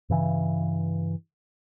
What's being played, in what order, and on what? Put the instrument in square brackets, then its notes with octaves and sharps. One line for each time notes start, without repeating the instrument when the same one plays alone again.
[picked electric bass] G2 C#3 E3